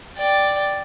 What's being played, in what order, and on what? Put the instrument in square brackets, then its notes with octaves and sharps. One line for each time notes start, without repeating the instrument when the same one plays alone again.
[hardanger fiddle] D5 G5